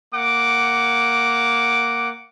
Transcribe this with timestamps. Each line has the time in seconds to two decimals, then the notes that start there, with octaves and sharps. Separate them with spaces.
0.14 A#3 F#5 D6